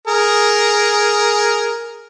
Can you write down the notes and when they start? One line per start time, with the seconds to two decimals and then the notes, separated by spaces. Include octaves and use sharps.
0.07 G#4 A#4